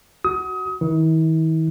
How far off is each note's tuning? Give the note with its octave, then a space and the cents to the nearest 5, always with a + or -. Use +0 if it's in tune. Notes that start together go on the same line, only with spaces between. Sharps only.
F#4 +10 D#6 +30
D#3 +40 E4 -40